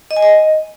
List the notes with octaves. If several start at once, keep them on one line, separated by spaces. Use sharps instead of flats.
D#5
G#5
D#5